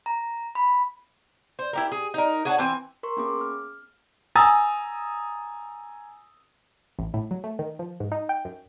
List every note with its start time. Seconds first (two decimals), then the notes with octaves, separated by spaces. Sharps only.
0.06 A#5
0.55 B5
1.59 C5
1.73 E4 G4 A#4
1.92 G#4
2.14 D#4 A#4
2.45 G#4 C#5 F#5 A5
2.58 E3 C4 G#5
3.03 A#4 C6 C#6
3.17 A#3 B3 C#4 G#4 D6
3.41 F6
4.35 G#5 A#5 D#6 E6 A6
6.99 A1
7.14 A2
7.31 F#3
7.44 A3
7.59 D#3
7.79 F3
8.00 G#2
8.12 D#4
8.29 G5
8.45 F#2